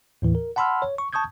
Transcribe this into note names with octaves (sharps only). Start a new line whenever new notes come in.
D#2 A2 E3
A#4
F#5 A5 B5 C6 E6 F6
C#5
C#6
A5 C#6 D#6 G6 G#6